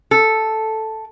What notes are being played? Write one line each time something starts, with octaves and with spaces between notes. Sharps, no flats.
A4